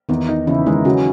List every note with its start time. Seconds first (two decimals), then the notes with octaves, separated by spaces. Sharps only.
0.09 E2 D#3 D#4
0.28 D#4
0.47 C#3 E3 E4
0.66 D#3 G#3 D#4
0.85 C#3 F#3 C#4